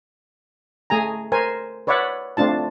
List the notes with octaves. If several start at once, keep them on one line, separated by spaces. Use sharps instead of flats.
A3 G#4 G#5 A#5
A#4 C5 G#5
B4 C#5 D5 E5 F#5
A3 C4 D4 F4 A5